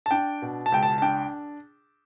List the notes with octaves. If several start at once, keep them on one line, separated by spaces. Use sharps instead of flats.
A5
D4 G5
B2
A5
C#2 G5
A5
A5
D4 G5